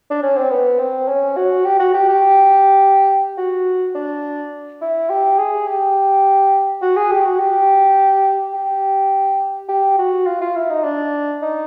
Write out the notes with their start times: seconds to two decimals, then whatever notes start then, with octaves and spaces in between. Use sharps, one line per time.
0.11 D4
0.23 C#4
0.37 C4
0.51 B3
0.79 C4
1.08 C#4
1.37 F#4
1.65 G4
1.79 F#4
1.94 G4
2.09 G4
3.38 F#4
3.95 D4
4.82 E4
5.09 G4
5.39 G#4
5.67 G4
6.82 F#4
6.96 G#4
7.11 G4
7.26 F#4
7.39 G4
8.54 G4
9.69 G4
9.98 F#4
10.27 F4
10.41 F4
10.56 E4
10.70 D#4
10.84 D4
11.42 D#4